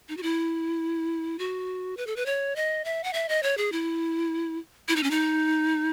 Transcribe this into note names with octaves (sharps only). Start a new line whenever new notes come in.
D#4
F#4
E4
F#4
B4
A4
B4
C#5
D#5
E5
F#5
E5
D#5
C#5
G#4
E4
E4
D#4
C#4
D#4